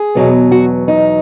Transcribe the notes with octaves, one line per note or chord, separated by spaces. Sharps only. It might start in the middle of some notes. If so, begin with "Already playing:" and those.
Already playing: G#4
E2 B2 F#3 B3
F#4
D#4